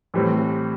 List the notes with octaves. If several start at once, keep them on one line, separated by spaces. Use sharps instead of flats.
A2 E3 G3 C4